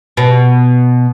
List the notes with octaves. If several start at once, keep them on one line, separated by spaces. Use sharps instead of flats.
B2